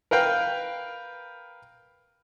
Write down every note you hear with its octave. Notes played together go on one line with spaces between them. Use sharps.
A#4 B4 F5 G5